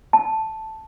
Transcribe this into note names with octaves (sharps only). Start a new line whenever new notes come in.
A5